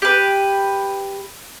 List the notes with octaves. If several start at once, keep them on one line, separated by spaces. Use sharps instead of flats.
G4 B4